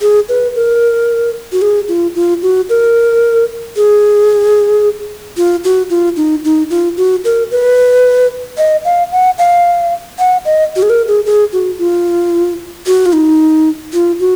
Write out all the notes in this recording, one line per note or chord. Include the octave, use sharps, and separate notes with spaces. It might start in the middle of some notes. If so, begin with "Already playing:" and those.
G#4
B4
A#4
F#4
G#4
F4
F4
F#4
A#4
G#4
F4
F#4
F4
D#4
D#4
F4
F#4
A#4
B4
D#5
F5
F#5
F5
F#5
D#5
F#4
G#4
A#4
G#4
G#4
F#4
F4
F#4
F4
D#4
F4
F#4